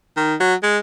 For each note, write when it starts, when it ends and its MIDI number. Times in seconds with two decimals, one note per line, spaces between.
0.16 0.35 51
0.40 0.54 54
0.63 0.78 56